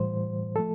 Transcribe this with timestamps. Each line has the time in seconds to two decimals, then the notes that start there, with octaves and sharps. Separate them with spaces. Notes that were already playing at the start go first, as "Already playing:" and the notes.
Already playing: A2 E3 G3 C5
0.56 F3 A3 A4